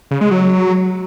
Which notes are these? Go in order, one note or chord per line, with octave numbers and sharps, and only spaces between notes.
C#3
G#3
F#3